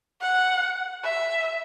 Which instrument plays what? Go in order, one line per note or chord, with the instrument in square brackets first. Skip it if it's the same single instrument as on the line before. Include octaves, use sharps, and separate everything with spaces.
[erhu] F#5
E5